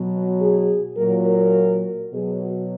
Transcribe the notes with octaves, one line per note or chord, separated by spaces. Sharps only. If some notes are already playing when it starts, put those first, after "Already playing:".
Already playing: B2 F#3
G#4
A#2 F#3 A#4
A#4
B2 F#3 G#4
F#4